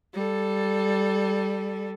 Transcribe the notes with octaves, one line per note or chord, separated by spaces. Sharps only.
G3 A4